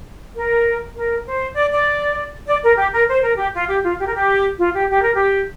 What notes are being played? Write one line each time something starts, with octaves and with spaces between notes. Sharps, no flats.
A#4
A#4
C5
D5
D5
D5
A#4
G4
A#4
C5
A#4
G4
F4
G4
F4
G4
A#4
G4
F4
G4
G4
A#4
G4